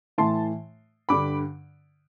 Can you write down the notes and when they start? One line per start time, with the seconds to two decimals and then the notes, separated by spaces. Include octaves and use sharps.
0.18 A2 E3 A5 C6
1.09 G2 D3 B5 D6